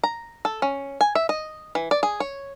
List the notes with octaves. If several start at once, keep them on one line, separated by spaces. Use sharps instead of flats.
A#5
A4
C#4
G#5
E5
D#5
E3
D5
G#4
C#5